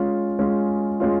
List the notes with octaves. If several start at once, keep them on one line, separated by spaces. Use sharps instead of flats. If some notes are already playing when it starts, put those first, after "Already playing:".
Already playing: G#3 C#4 F4
G#3 C#4 F4
G#3 C#4 F4